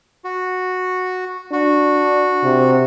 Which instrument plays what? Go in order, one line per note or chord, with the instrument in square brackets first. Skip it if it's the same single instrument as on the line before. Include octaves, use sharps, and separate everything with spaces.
[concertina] F#4
[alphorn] D4 [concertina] F#4
[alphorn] C3